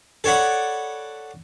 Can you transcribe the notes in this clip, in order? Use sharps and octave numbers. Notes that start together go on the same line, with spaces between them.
A4 C#5 D5 F#5 B5